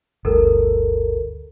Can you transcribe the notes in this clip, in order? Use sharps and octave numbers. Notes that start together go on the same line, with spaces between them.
G1 D2 A4 A#4